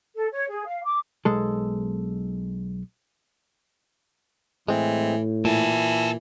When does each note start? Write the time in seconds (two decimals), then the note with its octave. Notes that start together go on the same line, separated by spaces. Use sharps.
0.15 A4
0.31 C#5
0.49 G#4
0.65 F5
0.83 D6
1.25 B1 G#3 A4
4.68 A2 E3 G#3 C4
5.45 A#2 E3 G4 A4